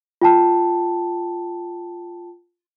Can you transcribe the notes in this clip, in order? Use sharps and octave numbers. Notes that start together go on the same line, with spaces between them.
F4 G5 A5